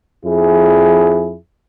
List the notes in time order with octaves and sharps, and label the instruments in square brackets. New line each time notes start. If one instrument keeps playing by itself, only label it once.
[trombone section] F2 E4 G#4